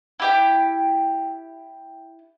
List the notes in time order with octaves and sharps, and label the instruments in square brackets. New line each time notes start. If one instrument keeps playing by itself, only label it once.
[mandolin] E4 G4 G5